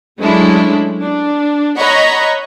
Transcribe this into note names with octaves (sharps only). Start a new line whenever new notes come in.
F#3 G#3 A3 C#4 D4 E4
D4
C#5 D#5 F#5 A#5 B5 C#6